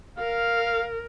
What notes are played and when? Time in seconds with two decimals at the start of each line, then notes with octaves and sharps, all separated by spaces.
0.19 A#4 F5